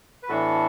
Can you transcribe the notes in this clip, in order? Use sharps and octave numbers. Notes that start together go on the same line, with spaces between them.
B4
A2 E3 B3 D4 F#4 A4